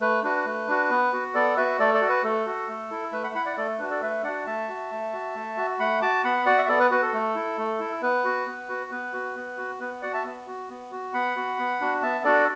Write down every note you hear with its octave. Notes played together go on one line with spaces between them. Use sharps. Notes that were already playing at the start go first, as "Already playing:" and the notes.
A3 B4
D4 F#4 B4
A3
D4 F#4
B3
F#4
B3 A4 D5
F#4 B4 E5
A3 A4 D5
A4 D5
F#4
B4
A3 A4
F#4
A3
E4
A3 B4 E5
F#5 B5
E4 F#5 B5
D5 F#5
A3 A4 D5
D4 F#4 B4
A4 D5
A3 B4 E5
D4 F#4 D5 F#5
A3 E5 A5
F#4
A3
F#4
A3
F#4
A3 F#5 B5
F#4 A5 D6
B3 F#5 B5
F#4 D5 F#5
E5
B3 A4 D5
B4
F#4 B4
A4
A3
E4
A3
E4
B3 B4
F#4
B3
F#4
B3 B4
F#4
B3
F#4
B3 B4
F#4 D5 F#5
E5 A5
B3
F#4
B3
F#4
B3 F#5 B5
F#4
B3
D4 F#4
B3 E5 A5
D4 F#4 A4 D5